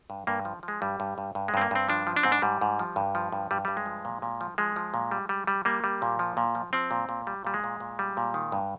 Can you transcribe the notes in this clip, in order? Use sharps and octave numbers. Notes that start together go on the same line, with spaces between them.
G2
G2 A#3
F3
F3
G#3
G2 G3
G2
G2
G2
G#3
G2 C4
A#3
G2 C4
F3 D4
F3
D4
G#2 C4
D4
G#2 G3
G#2
F3
G2
F3
G2
G2 G3
G2 G3
G#3
F3
A#2
A#2
F3
F3 G#3
F3
A#2
G3
G3
G3
G3 A#3
G3
A#2
F3
A#2
F3
F3 C4
A#2
A#2
G3
A#2 G3
G#3
A#2
A#2
G3
A#2
D#3
G2